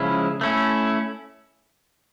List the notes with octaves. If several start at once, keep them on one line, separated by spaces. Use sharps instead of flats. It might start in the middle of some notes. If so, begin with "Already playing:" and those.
Already playing: C#3 F3 G#3 C#4 E4
A3 C#4 E4